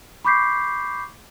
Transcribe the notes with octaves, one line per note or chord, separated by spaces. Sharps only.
B5 C#6 D6 G6 B6 C7